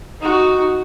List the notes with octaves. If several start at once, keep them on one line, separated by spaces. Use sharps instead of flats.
D#4 F#4